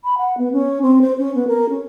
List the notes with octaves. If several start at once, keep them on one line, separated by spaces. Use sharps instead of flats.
B5
F#5
B3
C#4
C4
C5
C#4
B3
A#4
C#4